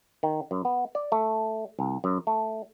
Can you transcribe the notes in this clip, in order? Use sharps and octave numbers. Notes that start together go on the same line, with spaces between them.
D#3
F#2
B3
D5
A3
C2
F#2
A3